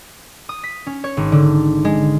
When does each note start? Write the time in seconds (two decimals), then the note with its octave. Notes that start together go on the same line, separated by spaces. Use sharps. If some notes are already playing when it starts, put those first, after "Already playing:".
0.49 D#6
0.63 B6
0.87 C#4
1.04 C#5
1.17 G#1
1.32 D3
1.85 G#3